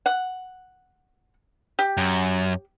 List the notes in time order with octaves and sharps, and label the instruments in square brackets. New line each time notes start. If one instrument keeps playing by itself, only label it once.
[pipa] F#5
G4
[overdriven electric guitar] F#2